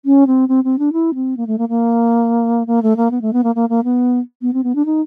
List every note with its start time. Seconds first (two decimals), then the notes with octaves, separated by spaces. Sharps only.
0.05 C#4
0.27 C4
0.49 C4
0.64 C4
0.79 D4
0.93 E4
1.14 C4
1.37 A#3
1.47 A3
1.58 A#3
1.69 A#3
2.67 A#3
2.83 A3
2.97 A#3
3.11 B3
3.22 A3
3.33 B3
3.44 A#3
3.55 A#3
3.69 A#3
3.84 B3
4.42 B3
4.54 C4
4.64 B3
4.75 D4
4.85 D#4